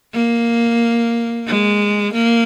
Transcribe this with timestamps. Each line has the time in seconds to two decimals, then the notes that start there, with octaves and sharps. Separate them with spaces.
0.13 A#3
1.47 G#3
2.14 A#3